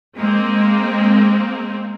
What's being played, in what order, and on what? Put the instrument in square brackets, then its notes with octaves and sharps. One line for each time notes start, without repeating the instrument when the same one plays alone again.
[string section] G#3 A#3 C4